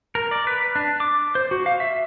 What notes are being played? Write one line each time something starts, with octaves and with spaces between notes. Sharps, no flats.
A#4
D5
B4
D4
D6
C5
F#4
F5
E5